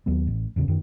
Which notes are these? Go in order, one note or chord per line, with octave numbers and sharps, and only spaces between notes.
D#2 F#3 B3
A1
A1 E2 C#3
F#2 D#3